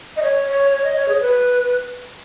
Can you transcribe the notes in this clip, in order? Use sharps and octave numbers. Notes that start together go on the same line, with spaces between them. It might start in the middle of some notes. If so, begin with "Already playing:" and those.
D#5
C#5
C#5
C#5
D#5
C#5
G#4
C#5
B4